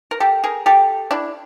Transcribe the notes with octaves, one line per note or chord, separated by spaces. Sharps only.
A#4
G4 A4
G#4 A#4
G4 A4
D4 E4